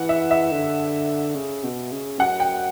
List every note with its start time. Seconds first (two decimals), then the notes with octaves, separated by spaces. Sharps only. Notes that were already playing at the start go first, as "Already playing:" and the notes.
Already playing: E3 F#5
0.09 E5
0.31 E5
0.52 D3
1.35 C#3
1.63 B2
1.92 C#3
2.19 F#2 F#5
2.40 G5